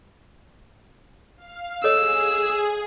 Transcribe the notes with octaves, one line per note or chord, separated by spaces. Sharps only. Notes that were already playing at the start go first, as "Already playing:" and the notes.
F5
G#4 A4 C#5 D#5 E6